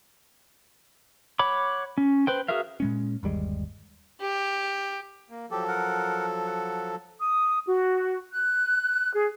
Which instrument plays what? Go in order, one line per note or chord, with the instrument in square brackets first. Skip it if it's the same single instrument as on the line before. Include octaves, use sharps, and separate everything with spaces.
[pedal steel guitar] C#5 F#5 B5 D6
C#4
B4 C5 G5
F#4 G#4 A#4 E5 F5
[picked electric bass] A#2 G#3 C#4
G1 D#2 G3 G#3
[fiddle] G4
[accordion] A#3
[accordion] F3 F#3 A4 [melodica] G4
[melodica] A#4 F#5
F#5
[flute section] D#6
F#4
F#6
G#4